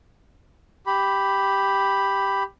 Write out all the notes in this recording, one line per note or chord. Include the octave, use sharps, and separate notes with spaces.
G4 B5